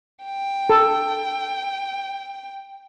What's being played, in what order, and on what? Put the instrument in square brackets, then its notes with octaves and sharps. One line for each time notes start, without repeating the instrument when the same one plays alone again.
[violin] G5
[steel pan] A4